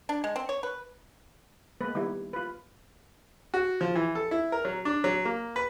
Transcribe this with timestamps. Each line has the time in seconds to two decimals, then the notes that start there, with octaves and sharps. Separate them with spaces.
0.09 D4
0.24 G#3
0.36 C4
0.49 C#5
0.63 B4
1.81 G#3 A#3 B3 B4
1.95 D#3 G3 B3 E4
2.33 F4 B4
3.54 F#4
3.81 F3
3.95 E3
4.15 A4
4.31 E4
4.52 A#4
4.65 F#3
4.85 D4
5.04 F#3
5.25 A#3
5.56 B4